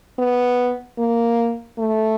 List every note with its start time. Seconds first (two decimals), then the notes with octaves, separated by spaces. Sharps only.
0.19 B3
0.98 A#3
1.78 A3